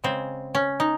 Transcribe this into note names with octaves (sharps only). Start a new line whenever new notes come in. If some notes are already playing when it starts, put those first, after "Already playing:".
C#3 G#3 C4
C#4
D#4